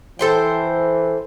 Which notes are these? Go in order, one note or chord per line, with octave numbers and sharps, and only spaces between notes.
E3 A4 C5 G5